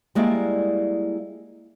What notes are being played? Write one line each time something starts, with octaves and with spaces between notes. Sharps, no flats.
G3 G#3 A#3 E4 D5